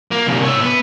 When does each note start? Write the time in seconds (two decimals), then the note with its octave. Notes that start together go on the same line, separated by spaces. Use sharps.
0.12 A#3
0.28 C2 A#2
0.45 C#5 E5
0.62 B3